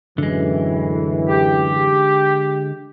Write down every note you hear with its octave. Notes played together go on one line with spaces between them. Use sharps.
F#2 A2 D3 E3 G#3
G4